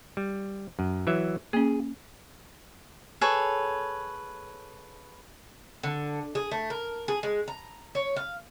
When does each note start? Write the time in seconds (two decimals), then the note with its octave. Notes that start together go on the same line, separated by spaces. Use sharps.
0.17 G3
0.79 F#2
1.07 E3 F#3 E5
1.53 A#3 C#4 G#4
3.21 G#4 A4 B4 C#5
5.83 D3
6.35 G#4
6.51 A3
6.70 A#4
7.08 G#4
7.23 G#3
7.48 A#5
7.95 C#5
8.16 F5